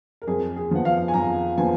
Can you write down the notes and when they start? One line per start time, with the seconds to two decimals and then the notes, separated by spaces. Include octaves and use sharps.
0.22 A#4
0.27 F2 G#4
0.56 G#4
0.71 F3 B3 F#5
0.85 F5
1.08 G#5
1.14 F2 A#5
1.58 F3 B3 G#5